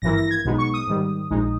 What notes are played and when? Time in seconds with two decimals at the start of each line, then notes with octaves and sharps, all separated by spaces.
0.02 G#1 G2 E3 A#3 E4 A#6
0.16 A#6
0.31 G#6
0.45 B1 B2 G#3 B3 D#4
0.58 C#6
0.74 D#6
0.87 G#2 D#3 G3
1.30 A#1 A#2 G#3 D#4